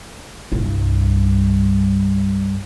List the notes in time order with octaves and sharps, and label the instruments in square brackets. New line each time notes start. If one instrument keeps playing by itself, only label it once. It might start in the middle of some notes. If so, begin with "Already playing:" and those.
[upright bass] C2 G2